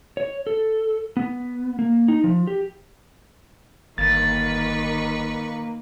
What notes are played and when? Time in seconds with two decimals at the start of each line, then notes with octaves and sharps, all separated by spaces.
0.17 C#5
0.47 A4
1.17 B3
1.79 A#3
2.08 D#4
2.24 F3
2.47 G4
3.98 G1 D#3 A#3 B4 C#6 A6